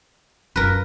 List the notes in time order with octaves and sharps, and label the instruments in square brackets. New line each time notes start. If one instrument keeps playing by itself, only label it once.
[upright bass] F#2 F4 [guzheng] A#4 B4